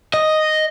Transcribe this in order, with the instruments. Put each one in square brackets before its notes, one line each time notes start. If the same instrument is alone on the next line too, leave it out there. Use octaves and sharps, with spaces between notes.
[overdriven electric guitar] D#5